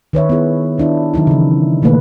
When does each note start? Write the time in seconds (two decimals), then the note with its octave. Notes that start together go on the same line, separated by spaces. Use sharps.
0.13 D#3 B4 C#5 E5
0.29 B3 D#4 E4 G#4
0.78 D#3 D4 E4 F4
1.14 D#3 F#3 D#4 E4
1.27 C#3 E3
1.82 B2 D3 D#3 A3 A#3 B4